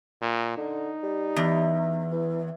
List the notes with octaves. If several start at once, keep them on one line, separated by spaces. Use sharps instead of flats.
A#2
D3 D#4
G3
E2
E3